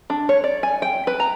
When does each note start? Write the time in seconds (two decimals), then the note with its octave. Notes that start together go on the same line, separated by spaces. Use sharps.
0.10 D4
0.29 C#5
0.44 D5
0.63 G#5
0.82 G5
1.07 B4
1.20 A#5